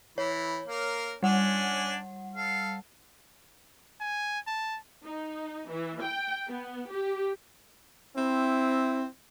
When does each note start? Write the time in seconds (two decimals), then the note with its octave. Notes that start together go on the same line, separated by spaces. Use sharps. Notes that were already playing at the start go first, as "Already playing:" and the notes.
0.18 E3 C#5
0.67 A#3 A#4
1.23 G3 C#4 D4 F#5 G#5
2.36 A4 F5
4.00 G#5
4.47 A5
5.03 D#4
5.69 E3
6.01 G5
6.48 B3
6.90 G4
8.17 C4 E4